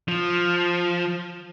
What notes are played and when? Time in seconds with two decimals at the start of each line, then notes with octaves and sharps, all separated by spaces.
0.08 F3